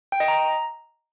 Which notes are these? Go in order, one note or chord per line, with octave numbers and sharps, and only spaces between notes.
G5
D#5
A#5